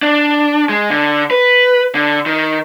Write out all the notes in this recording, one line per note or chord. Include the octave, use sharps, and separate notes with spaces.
D4
G#3
D3
B4
D3
D#3